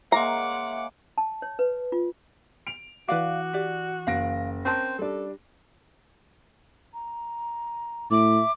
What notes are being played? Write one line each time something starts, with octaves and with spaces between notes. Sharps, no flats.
G#3 A#3 C#5 E5 F#5 A#5 C6 D6
A5
C#5
B4
F4
D7 F7
E3 F#4 B4 D5 F5 D6
G4 D5
F#1 F5 A#6 D7
C4 C#4 A#4 A5 C6
G3 D4 A4
A#5
A2 E5 D6